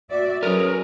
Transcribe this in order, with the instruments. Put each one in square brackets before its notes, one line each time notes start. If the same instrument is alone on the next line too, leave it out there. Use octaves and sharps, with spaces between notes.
[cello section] F#4 D5 E5
[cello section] F#3 C#4 G#4 [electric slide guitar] A#4 B4